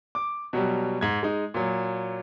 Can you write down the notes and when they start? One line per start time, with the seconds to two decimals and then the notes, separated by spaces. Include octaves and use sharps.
0.15 D6
0.53 B2 F#3 G3
1.01 G#2 G#6
1.23 G#3 D#4
1.54 A#2 F#3